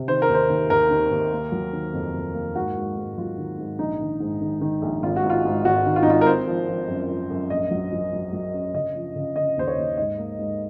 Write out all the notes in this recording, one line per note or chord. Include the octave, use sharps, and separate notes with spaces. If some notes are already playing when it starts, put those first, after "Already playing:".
Already playing: C3
D#3 C5
A#4
D#2
C5
D#2
D#2 A#4
D#3
D#2
A#3
F#3
D#3
F2
F2
A#3
G#2 F#4
G#2
G#2
F#3 F4
D#3
G#2
A#1 D#4
D#3
G#2
D#3
D#3
A#1
G#1 F4
F#4
G#2
F4
G#2
G#1 F#4
D#3
F4
D#4
G#1 F4
A#4
C4 C5
F3
F3
F#2
F3
F#2
A#1 D#5
F#3
F#3
F#3
F#3
C#4
C#3 D#5
F3
C#3
C#3 D#5
D#2 C5
C#5
D#2
G#2 D#5
A#3
G#2